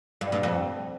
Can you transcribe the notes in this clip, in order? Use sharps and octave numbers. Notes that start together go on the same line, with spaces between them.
G2
G2
F2